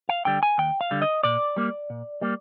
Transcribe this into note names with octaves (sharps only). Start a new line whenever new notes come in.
F5
D3 G3 G5
G#5
D#2 G5
F5
D3 G3
D#5
A#2 D5
G3 A#3
A#2
G3 A#3